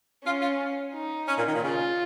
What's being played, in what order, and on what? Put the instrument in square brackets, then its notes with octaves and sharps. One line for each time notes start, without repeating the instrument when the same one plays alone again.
[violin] C#4 [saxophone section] F4
[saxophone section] F4
[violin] D#4
[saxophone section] C#4
A#2
D#3
A#2
[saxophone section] C#3 [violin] F4